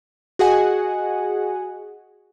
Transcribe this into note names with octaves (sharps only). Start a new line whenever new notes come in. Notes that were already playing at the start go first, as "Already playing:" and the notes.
F#4 G#4 D#5 F#5 G#5